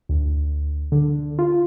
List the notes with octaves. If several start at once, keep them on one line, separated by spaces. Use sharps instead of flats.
D2
D3
F4